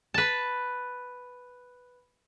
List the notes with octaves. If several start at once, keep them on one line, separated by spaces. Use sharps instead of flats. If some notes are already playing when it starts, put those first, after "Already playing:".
B4 A5